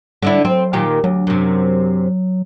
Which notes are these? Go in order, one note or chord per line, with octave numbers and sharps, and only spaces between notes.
D3 G3 D4 E4
F#3 C4
A#2 D#3 G4
D2 F#3
F#2 C3